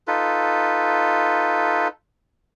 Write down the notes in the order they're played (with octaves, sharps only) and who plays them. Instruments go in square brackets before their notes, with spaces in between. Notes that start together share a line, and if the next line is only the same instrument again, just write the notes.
[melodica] D#4 F4 A4 B4